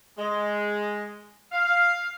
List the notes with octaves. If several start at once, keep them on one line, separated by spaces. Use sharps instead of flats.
G#3
F5